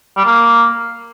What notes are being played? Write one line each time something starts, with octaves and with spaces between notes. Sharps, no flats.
G3
A#3